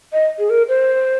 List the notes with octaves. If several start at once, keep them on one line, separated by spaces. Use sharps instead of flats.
D#5
G#4
A#4
C5